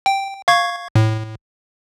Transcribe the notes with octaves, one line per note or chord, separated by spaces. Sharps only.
G5
F5 C#6 G#6
A2